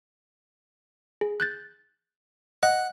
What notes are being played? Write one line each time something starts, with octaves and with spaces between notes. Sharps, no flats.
G#4
F#6 G6 A6
D#5 F#5